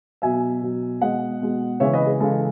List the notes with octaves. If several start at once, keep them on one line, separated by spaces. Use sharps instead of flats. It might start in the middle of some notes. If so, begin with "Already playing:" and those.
B2 F#3 E5 G#5
B2 F#3
B2 G#3 D#5 F#5
B2 G#3
C#3 E3 G#3 C#5 E5
B4 D#5
G#4
C#3 E3 G#3 A4